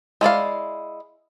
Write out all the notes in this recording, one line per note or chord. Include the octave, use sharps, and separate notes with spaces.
G#3 E4 D5 F5